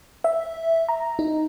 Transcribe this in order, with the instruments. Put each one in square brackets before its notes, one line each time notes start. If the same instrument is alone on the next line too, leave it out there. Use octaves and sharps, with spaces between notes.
[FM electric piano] E5
A#5
D#4